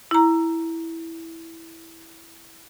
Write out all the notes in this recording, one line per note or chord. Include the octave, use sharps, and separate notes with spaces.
E4 A#5